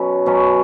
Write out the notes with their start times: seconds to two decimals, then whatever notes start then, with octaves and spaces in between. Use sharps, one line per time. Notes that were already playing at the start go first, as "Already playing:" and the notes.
Already playing: B2 F#3 C#4
0.26 B2 F#3 C#4